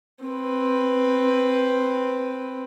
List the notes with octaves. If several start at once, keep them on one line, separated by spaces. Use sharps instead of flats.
C4 B4